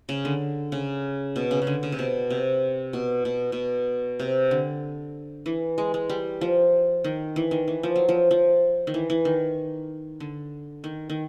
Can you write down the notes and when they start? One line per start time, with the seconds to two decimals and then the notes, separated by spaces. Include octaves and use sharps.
0.09 C#3
0.25 D3
0.72 C#3
1.36 B2
1.51 C#3
1.62 C#3
1.67 D3
1.83 C#3
1.92 C3
1.99 B2
2.30 C3
2.93 B2
3.25 B2
3.52 B2
4.20 C3
4.51 D3
5.46 E3
5.78 G#3
5.94 G#3
6.09 G3
6.41 F3
7.04 D#3
7.36 E3
7.51 D#3
7.68 E3
7.83 F3
7.96 F#3
8.09 F3
8.31 F3
8.87 D#3
8.94 E3
9.10 E3
9.25 D#3
10.20 D3
10.84 D#3
11.10 D#3